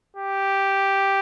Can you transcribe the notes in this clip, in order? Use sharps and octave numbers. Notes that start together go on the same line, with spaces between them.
G4